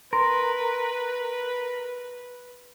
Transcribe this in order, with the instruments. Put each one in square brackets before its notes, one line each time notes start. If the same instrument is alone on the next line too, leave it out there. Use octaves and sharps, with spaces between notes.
[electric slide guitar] A#4 [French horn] B4 [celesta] C6